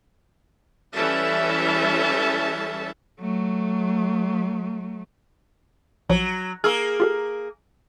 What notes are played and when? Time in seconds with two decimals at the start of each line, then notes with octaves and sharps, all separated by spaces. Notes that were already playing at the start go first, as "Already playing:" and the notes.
0.94 E3 G3 C#4 A4 E5 A5
3.20 F#3 A3
6.09 A#1 F3 F#3 C#5
6.64 A#3 G#4 C#6 E6 F6
7.00 F4 G4 A4